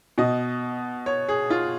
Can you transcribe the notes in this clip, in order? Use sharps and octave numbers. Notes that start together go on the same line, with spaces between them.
B2 D#5
C#5
G#4
F4